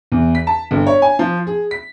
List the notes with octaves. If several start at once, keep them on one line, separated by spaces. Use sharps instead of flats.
E2
B6
A5
G1
C#5
G#5
F3
G#4
B6